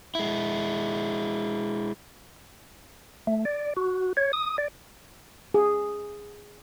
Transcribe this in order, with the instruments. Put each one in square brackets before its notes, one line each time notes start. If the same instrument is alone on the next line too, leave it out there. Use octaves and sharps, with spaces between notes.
[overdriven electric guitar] G#3 E4
[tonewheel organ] A3
D5
F#4
C#5
D#6
D5
[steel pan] G#4